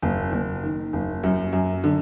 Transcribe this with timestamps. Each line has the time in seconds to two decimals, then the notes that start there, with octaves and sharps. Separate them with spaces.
0.02 F#1
0.32 F#1
0.63 D#3
0.93 F#1
1.23 F#2
1.53 F#2
1.84 D3